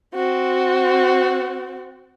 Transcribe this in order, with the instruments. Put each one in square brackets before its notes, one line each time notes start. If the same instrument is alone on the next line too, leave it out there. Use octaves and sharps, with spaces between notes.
[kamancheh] C4 F#4